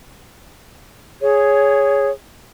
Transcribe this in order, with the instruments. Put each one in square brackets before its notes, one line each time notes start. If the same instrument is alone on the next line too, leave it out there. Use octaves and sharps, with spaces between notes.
[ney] G#4 [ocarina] C#5